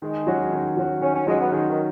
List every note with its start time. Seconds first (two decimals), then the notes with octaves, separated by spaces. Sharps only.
0.02 D#3 G#3
0.27 F#3 C#4 F#4
0.52 D#3
0.77 F#3 C#4 F#4
1.02 D#3 C#4
1.15 C#4
1.27 F#3 G#3 C#4 F#4
1.40 B3
1.52 D#3 G#3
1.68 D#3